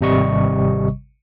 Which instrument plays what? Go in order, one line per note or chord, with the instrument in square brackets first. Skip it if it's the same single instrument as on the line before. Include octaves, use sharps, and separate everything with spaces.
[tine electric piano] G#1 C3 G3 D#5 C#6